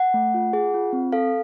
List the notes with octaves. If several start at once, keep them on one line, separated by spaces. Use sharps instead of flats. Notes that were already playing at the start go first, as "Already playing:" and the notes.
Already playing: F#5
A3
F4
G#4
F4
C4
A4 F5